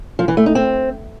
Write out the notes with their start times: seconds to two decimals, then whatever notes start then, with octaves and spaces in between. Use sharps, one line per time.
0.19 F3
0.28 E3
0.37 A3
0.46 D#4
0.55 C4